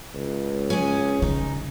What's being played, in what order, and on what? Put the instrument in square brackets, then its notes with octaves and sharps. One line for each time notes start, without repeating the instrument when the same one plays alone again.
[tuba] C#2
[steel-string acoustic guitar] C#4 G#4
[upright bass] C#3 [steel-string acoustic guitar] D#4